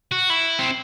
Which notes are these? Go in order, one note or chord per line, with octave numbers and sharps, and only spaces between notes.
F#4
E4
C4